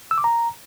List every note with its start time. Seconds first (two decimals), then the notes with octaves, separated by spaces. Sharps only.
0.11 E6
0.18 D6
0.24 A#5